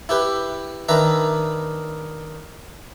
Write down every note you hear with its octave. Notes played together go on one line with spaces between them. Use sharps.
E4 G4 B4
D#3 D4 B4 E5 A#5